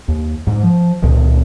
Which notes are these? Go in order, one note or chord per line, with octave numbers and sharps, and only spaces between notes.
D#2
G#2
F3
C#2 A#2 D#3